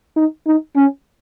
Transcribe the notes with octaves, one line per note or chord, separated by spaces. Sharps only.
D#4
D#4
C#4